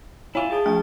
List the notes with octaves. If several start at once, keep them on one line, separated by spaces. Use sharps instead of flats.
E4 F4 C#5 F5 G#5
G#4 G5 A5
F3 A3 F6